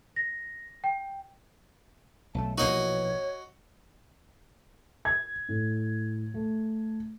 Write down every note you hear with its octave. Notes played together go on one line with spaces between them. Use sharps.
A#6
G5
B1 A3 A5
A#1 B2 E3 A#3 D#4 F#4 C#5 D#5
G#6
A2
A3